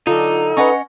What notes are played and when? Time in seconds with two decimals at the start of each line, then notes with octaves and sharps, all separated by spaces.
0.07 D3 F#3 D#4 F4 A4
0.57 C#4 B4 D#5 F#5 C#6